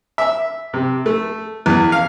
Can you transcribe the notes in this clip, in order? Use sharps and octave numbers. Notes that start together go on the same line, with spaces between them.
E5
C3
A3
E2
F5